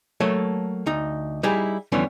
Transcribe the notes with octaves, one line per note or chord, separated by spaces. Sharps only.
F#3 A3 A#3 A4 C#5 E5
D2 D#4
G3 D#4 E4 G4 G#4
F2 D3 E3 G3 B3 C#4